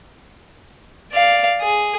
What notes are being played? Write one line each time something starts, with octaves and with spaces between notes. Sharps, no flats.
D5 F5
G#4